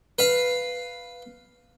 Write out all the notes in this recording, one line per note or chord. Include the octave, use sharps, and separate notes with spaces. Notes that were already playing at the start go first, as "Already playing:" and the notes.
B4 F5